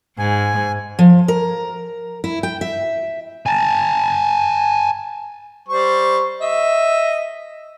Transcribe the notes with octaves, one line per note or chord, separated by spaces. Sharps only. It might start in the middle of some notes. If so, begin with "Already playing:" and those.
G#2 G#5
F3
A#4
E4
G5
E5
G#5 A5
G3 C5 C#6
D#5 E5